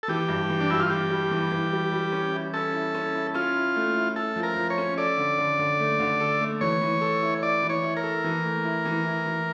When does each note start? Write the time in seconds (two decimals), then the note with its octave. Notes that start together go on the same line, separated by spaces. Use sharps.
0.03 A4
0.08 E3 G4
0.28 G2
0.50 E3
0.61 D4
0.70 G2 E4
0.80 F4
0.90 E3 G4
1.10 G3
1.31 E3
1.51 E3
1.72 G3
1.92 G3
2.12 C#4
2.32 E4
2.54 C#4 A4
2.73 E4
2.95 C#4
3.14 E4
3.34 C#4 F4
3.56 E4
3.76 A3
3.96 E4
4.16 E4 A4
4.36 F3
4.43 A#4
4.57 F3
4.70 C#5
4.78 C#4
4.97 A4 D5
5.17 D3
5.38 D3
5.59 D3
5.80 A3
6.00 D3
6.20 A4
6.41 A3
6.61 E3 C#5
6.81 E3
7.01 A4
7.22 E4
7.42 E4 D5
7.63 E3
7.70 C#5
7.83 E4
7.97 A#4
8.03 A4
8.24 E3
8.44 A3
8.64 E4
8.85 E3
9.05 E4
9.26 E3